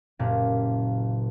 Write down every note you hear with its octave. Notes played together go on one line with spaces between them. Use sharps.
F#1 A#2 G4